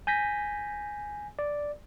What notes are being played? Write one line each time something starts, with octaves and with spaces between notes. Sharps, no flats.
G#5 G6 A#6 B6
D5